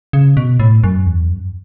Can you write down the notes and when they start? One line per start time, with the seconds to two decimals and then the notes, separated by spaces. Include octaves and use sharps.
0.13 C#3
0.37 B2
0.60 A2
0.84 F#2
1.06 E2
1.30 F#2